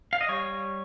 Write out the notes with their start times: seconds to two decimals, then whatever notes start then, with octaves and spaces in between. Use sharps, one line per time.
0.13 F5
0.21 D#5
0.29 G3 C#5